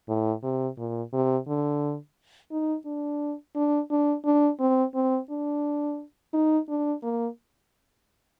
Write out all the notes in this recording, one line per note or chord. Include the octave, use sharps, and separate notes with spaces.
A2
C3
A#2
C3
D3
D#4
D4
D4
D4
D4
C4
C4
D4
D#4
D4
A#3